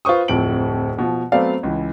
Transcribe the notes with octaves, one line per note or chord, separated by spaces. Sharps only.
F4 B4 C5 C#6 D#6
D1 F2 C4 D7 F#7
B2 F3
F#3 A3 B3 C4 D5 F5
C#2 E3